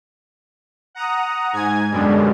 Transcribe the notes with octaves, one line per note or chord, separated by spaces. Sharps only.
F#5 A#5 D#6
G#2 G#5 G#6
F#2 B2 D3 G3 G#3